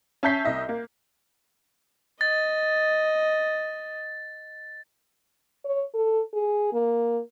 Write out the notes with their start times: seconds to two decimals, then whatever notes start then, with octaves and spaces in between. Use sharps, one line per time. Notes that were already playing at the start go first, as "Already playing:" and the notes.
0.23 C#4 E5 A5 G6 B6 C7
0.45 C2 D#5 E5
0.69 A#3
2.21 D#5 A6
5.65 C#5
5.94 A4
6.34 G#4
6.73 A#3